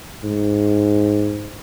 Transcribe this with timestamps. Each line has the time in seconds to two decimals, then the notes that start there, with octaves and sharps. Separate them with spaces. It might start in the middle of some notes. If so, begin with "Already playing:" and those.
0.24 G#2